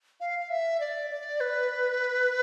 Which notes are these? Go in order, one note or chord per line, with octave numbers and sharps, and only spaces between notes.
F5
F5
E5
D5
D5
B4